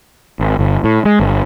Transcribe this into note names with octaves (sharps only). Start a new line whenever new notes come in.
G#1
G1
A2
G#3
G1